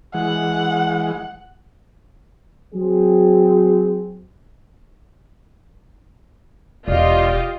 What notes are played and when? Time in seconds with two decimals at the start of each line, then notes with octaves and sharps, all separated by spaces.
0.14 E3 G#3 F#5
2.74 F#3 C4 G#4
6.88 E1 F4 G4 D5 D#5